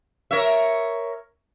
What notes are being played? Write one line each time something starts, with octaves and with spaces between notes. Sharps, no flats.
A#4 C#5 E5